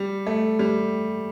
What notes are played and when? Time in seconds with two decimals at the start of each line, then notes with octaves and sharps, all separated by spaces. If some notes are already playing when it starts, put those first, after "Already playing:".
Already playing: G3
0.27 A3
0.59 G3